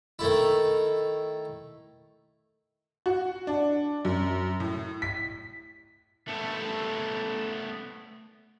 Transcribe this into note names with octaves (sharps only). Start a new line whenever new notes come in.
D#3 A3 E4
F#4
D4
F#2
A2
B6
A3 B3